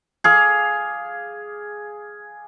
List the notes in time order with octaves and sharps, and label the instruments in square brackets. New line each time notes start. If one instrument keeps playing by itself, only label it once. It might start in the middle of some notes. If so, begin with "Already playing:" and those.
[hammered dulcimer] G#4 F5 D6